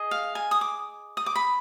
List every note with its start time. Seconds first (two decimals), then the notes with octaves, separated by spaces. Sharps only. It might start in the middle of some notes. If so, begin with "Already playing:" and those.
Already playing: G#4 D#5
0.11 F5
0.35 G#5
0.51 D#6
0.61 D6
1.17 D#6
1.26 D6
1.35 B5